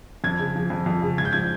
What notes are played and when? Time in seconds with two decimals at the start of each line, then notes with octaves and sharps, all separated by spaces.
0.24 F2 G#6
0.39 C#3
0.56 F3
0.70 F2
0.86 F2
1.02 C#3
1.18 G#2 G#6
1.25 G6
1.33 F3 G#6